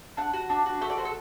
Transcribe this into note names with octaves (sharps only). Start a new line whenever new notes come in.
D4 F#5
F#4
D4
F#4
A3 E5
D5
F#4 C5
A4